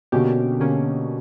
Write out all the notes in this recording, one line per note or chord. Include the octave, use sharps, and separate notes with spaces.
B2 D3 A#3 C#4 G4
D3 A#3 C#4 G4